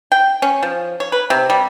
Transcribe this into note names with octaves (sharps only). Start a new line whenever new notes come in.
G5
C#4
F3
C#5
B4
C3
G3